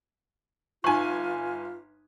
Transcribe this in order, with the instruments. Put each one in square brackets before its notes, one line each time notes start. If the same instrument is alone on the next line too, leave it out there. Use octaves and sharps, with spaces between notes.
[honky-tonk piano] G1 G#5 [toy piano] D#4 C#6 [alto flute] F4